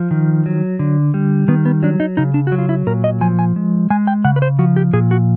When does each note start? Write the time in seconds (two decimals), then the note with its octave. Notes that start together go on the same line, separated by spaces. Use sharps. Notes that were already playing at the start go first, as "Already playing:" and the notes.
Already playing: F3
0.11 D#3
0.46 F#3
0.79 D3
1.14 G3
1.48 D#3 B3
1.65 B3
1.83 F#3 D4
2.00 D#4
2.17 C#3 D#4
2.34 D4
2.47 F#3 F#4
2.58 F4
2.69 E4
2.87 A#2 A#4
3.04 D#5
3.21 F3 G#5
3.39 G#5
3.56 G#3
3.90 G#3 G#5
4.07 G5
4.25 C#3 F#5
4.36 B4
4.42 C5
4.59 F3 F#4
4.76 G4
4.93 A#2 G#4
5.11 F#4